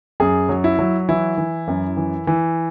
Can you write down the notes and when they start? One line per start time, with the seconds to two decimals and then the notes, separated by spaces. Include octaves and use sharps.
0.20 F#2 G#4
0.49 F#3
0.64 E4
0.79 F#3
1.09 E3 E4
1.38 E3
1.68 F#2
1.97 E3
2.27 E3